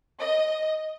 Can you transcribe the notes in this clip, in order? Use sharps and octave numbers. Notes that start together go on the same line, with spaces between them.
D#5